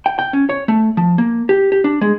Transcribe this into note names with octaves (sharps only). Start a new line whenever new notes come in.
G5
G5
C#4
C#5
A3
F3
A#3
G4
G4
D4
G#3